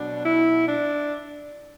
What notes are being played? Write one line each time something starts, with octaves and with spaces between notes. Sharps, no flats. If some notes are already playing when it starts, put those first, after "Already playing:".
Already playing: B2 F#3 D4
E4
D4